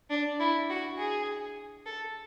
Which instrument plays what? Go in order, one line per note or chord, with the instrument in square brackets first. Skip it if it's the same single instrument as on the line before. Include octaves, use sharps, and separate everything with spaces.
[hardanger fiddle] D4
E4
F#4
G#4
A4